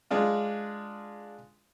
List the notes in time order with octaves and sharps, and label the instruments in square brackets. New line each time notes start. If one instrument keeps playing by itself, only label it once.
[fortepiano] G#3 D4 F4